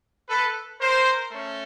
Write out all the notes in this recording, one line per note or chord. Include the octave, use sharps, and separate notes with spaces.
A4 B4
A#4 C5
A3 C#4